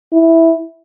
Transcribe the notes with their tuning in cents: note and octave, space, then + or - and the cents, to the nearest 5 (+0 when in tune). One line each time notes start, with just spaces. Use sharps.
E4 -5